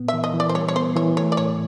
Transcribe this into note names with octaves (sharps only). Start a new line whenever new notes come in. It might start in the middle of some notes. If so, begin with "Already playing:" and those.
Already playing: A#2 B3
E3 E5
D#5
E3
D5
C5
G3 C#5
C#5
B3 C5
E3 C#5
A3 C#5
D5
A2 C#5